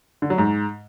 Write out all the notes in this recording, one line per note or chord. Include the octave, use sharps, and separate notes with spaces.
D3
F#3
G#2